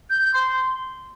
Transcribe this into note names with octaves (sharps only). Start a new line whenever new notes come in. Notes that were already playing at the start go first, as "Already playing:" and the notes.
G6
G6
C6